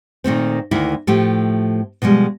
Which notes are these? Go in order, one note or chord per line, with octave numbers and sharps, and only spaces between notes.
A#2 D#3 A3 C4
D2 D#3 A#3 E4
A2 F3 A3 G4
B2 F3 G3 G#3